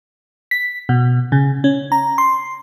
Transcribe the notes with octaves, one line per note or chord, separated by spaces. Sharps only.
B6
B2
C#3
C#4
A#5
C6